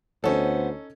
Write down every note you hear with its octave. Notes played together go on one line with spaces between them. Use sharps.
D2 B3 C#4 D#4 A4 C5 C#5